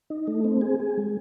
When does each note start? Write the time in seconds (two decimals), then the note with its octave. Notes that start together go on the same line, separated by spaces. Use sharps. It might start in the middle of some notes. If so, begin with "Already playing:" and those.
0.10 D#4
0.27 A3
0.44 C4
0.61 G#4
0.80 G#4
0.97 G#3